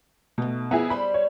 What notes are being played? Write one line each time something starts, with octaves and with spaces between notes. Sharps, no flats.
B2 A3 D#4
F2 B3 E4 G#4 A#5
G3 C5 D5 B5
C#5